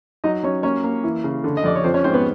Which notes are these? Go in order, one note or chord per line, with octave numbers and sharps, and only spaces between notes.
F#3 D#4 D#5
F#3 C#4 C#5
A#3 C#4 C#5
A#3
E3
C#3
D3
D#5
F2 D5
C#5
F3 C4 C5
C#4 C#5
G#2 C4 C5
B3 B4